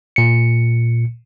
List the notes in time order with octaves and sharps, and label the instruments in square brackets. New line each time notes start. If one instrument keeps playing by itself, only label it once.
[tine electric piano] A#2 C#7